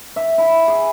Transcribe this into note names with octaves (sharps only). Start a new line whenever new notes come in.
E5
E4
G#4